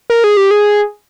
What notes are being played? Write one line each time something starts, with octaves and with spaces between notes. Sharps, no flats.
A#4
G#4
G4
G#4